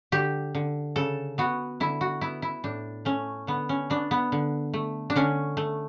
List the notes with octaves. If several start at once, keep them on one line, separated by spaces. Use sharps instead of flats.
D3 G4
D3
C#3 A4
B3 F#4
D3 E4
F#4
B3 E4
E4
A2 D4
A3 C#4
D3 B3
C#4
B3 D4
B3
D3
A3
D4
D3 C#4
A3